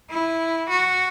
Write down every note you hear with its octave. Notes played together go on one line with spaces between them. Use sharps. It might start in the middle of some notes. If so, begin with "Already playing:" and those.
E4
F#4